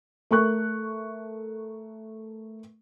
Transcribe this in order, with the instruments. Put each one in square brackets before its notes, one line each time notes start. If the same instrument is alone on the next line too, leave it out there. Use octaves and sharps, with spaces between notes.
[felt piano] A3 A#4 C#6 F#6